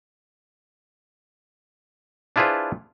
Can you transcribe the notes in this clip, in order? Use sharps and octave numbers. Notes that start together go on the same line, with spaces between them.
D4 E4 F4 G#4 B4 C5